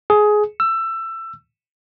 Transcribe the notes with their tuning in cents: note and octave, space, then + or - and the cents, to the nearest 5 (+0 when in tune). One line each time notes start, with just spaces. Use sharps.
G#4 +15
E6 +20